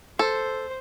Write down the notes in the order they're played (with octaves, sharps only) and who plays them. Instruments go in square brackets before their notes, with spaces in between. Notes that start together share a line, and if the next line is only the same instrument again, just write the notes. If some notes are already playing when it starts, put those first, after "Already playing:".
[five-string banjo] A4 [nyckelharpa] C5